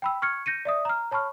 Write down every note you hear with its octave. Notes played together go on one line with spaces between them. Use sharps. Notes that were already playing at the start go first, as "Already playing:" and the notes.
G5 B5 E6
C#6 F6 G#6 C#7
G6 A#6 C#7 D#7
D5 E5 D#6
A#5 F6
C#5 A5 B5 C#6 F6